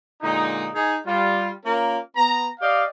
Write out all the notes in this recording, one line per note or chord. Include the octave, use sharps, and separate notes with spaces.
A#2 D3 G#3 D#4
D#4 G#4
G3 F4
A#3 C#4 F4 A#4
B3 A#5
G4 D5 D#5 F5